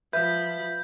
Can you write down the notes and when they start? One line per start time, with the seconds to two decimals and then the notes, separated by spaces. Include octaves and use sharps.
0.13 F3 B4 E5 F5 B5 G6